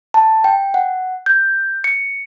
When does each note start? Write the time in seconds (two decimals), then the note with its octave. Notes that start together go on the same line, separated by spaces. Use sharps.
0.14 A5
0.44 G5
0.74 F#5
1.26 G6
1.84 C#7